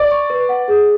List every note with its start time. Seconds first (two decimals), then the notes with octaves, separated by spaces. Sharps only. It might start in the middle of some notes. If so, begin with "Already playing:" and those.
Already playing: D5
0.11 C#6
0.30 B4
0.49 F#5
0.68 G#4